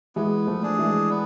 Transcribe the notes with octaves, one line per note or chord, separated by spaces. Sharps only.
E3 G#3 B3
F3 A3
D4 G#4
E3 G#3
B3